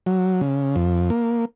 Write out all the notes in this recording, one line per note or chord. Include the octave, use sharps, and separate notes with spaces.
F#3
C#3
F2
A#3